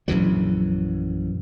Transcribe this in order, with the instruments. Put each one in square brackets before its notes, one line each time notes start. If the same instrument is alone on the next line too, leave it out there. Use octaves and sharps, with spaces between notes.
[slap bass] A#1 F#2 E3 F#3